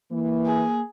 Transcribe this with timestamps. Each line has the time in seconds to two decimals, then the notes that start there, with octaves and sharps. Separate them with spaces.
0.11 E3 A#3
0.46 G#4